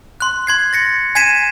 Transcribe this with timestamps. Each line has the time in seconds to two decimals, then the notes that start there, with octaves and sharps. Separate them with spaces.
0.20 C6 F#6
0.47 C6 G#6 C7
0.73 A6 A#6 C#7
1.15 G#5 G#6 B6 C7 D#7 E7